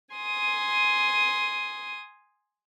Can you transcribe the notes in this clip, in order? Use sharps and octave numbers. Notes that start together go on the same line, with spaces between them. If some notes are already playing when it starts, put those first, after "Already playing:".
G#5 C6 D#6